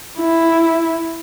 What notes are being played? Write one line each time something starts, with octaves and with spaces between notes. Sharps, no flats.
E4